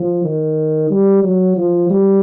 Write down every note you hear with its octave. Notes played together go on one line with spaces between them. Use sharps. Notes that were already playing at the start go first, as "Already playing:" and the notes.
Already playing: F3
D#3
G3
F#3
F3
G3